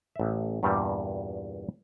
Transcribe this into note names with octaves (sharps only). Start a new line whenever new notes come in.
A1 E5
E2 G2 A#2 G3